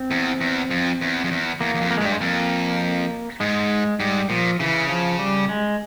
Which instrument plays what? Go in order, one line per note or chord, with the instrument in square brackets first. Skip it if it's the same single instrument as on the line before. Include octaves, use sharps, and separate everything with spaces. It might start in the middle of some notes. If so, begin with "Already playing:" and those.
Already playing: [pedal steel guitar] C4
[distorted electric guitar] E2
E2
F2
E2
F2
E2
[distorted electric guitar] E2 [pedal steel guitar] A#3
[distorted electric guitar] E2
F2
[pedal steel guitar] A#3
G#3
[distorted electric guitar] G2 [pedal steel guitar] G3
[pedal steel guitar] G#3
[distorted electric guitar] F2 [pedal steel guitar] A#3
[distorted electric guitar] G#2 [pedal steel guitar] G#3
[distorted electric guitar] G#2 [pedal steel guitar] G3
[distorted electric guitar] A#2 [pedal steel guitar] F3
[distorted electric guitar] C#3 [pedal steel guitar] E3
[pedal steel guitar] F3
G3
G#3